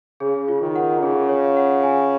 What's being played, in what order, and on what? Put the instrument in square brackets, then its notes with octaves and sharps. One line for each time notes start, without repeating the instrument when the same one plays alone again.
[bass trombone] C#3 [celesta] G#4
[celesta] F4
[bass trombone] D#3
[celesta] F#5
[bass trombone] C#3 [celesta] G#4
[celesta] C#5
F#5
G#5